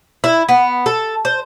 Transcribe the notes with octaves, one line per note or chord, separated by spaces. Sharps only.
E4
B3
A4
C5